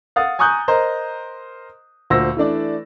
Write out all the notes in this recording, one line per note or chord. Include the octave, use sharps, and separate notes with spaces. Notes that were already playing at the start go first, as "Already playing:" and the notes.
F5 F#5 D#6 A6
G#5 A#5 C#6 D#6 F#6 G6
A#4 C5 D#5 A#5
D2 A#2 C5 E6 A#6
E3 A3 D4 D5